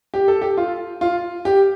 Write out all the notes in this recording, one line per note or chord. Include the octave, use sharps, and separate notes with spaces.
G4
A4
G4
F4
F4
G4